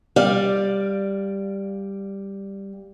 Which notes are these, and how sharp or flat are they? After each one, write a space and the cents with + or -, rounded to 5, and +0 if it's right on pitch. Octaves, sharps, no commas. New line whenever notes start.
G3 +5 D5 +0 F5 +5